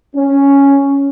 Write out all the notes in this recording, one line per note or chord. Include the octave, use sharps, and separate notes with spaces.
C#4